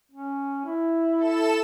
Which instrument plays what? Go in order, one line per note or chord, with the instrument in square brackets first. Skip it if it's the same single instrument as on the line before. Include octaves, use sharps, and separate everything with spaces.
[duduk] C#4
E4
[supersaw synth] A4 E7